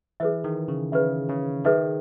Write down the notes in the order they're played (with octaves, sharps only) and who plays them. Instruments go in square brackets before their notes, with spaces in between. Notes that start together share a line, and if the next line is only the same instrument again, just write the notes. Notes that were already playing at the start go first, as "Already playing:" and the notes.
[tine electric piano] E3 [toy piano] G#4 B4 E5
[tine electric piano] D#3
C#3
[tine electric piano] C#3 [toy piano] G#4 B4 E5
[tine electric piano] C#3
[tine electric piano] D#3 [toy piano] G#4 B4 E5